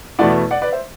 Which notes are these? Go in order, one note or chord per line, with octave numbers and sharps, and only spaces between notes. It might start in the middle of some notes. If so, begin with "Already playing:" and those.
E2 B2 A3 E4 D5 F#5
D5 F#5
B4 D5
C5 E5